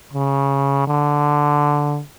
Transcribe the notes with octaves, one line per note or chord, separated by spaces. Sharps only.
C#3
D3